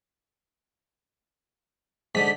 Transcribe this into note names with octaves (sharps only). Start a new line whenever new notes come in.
G#2 D3 B6